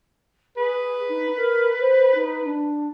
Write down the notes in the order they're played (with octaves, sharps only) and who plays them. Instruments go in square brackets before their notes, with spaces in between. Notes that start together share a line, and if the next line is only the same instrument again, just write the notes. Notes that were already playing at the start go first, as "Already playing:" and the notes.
[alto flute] G#4 [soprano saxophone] B4
[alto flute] D#4
A#4
C5
D#4
D4